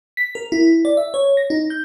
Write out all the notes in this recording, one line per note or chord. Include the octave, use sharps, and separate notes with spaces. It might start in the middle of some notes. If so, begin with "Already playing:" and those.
B6
A#4
E4
D5
E5
C#5
A#6
D#4
G6